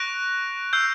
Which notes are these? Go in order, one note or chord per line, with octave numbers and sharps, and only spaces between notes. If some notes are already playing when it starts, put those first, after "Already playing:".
Already playing: C#6 F#6 A#6 D7 F7
E6 G6 C7